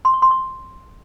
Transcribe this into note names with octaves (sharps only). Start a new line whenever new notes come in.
C6
C#6
C6
C#6